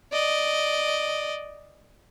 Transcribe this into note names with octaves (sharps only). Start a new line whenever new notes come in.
D5 D#5